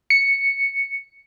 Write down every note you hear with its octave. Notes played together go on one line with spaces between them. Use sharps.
C#7